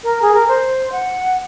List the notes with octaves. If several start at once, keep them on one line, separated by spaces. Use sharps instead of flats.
A#4
G#4
A#4
C5
F#5